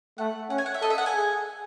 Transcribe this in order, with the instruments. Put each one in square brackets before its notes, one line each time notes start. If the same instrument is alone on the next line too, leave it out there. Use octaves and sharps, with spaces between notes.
[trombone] A3 [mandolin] F#5
[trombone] C#4 [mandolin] F#5
[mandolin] G#5
F#5
E5
[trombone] A4 [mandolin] D#5
[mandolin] E5
F#5
G#5
[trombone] G#4